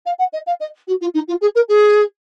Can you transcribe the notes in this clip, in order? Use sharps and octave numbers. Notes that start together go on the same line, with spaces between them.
F5
F#5
D#5
F5
D#5
F#4
F4
D#4
F4
G#4
A#4
G#4